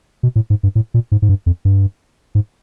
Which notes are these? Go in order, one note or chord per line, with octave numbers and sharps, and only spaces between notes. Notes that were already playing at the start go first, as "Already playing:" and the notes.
B2
A2
G#2
G2
A2
A#2
G#2
G#2
G2
F2
G2
G#2